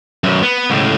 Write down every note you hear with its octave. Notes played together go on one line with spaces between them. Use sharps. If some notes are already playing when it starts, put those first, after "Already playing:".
F#2 B2
B3
C#2 A2